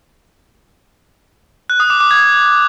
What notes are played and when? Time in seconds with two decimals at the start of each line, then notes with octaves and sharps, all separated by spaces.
1.70 F#6
1.80 D#6
1.90 D6
2.00 D6
2.11 G#6